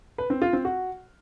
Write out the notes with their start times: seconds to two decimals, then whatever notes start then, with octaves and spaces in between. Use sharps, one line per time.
0.18 B4
0.30 C4
0.42 F4
0.53 C4
0.65 F#4